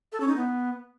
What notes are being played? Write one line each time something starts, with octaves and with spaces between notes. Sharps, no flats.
A4
C#4
D#4
B3